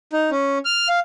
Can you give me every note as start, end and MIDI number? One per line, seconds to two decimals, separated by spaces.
0.13 0.30 63
0.31 0.58 61
0.65 0.88 89
0.88 1.00 77